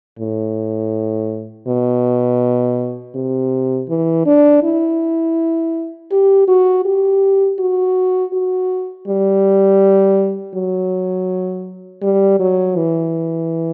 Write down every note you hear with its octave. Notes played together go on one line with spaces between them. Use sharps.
A2
B2
C3
E3
D4
E4
G4
F#4
G4
F#4
F#4
G3
F#3
G3
F#3
E3